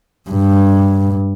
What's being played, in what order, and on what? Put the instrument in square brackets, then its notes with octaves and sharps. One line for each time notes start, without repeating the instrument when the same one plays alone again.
[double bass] G2